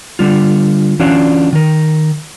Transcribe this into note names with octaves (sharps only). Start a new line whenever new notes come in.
D3 G3 F4
E3 C#4 D4 F4 F#4 D5
D#3 A#4